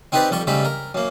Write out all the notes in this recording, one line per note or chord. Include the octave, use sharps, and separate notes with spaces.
C4 D#4 G4 B4 C5 D5
F2 G3 A4 C#6
G#2 C#3 G3 A3 B5
A#4
F#2 A#3